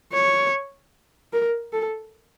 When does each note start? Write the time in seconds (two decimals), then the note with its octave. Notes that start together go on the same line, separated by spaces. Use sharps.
0.13 C#5
1.33 A#4
1.73 A4